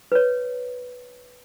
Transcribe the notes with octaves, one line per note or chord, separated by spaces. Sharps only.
B4 C#5